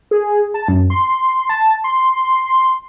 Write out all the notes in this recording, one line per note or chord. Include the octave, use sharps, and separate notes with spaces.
G#4
A5
F#2
C6
A5
C6